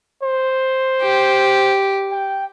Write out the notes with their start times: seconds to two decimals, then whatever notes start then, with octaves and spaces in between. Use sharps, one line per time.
0.23 C5
1.02 G4
2.11 G5